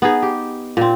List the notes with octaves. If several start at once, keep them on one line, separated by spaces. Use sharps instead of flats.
B3 D#4 G#4
G4
A#2 C4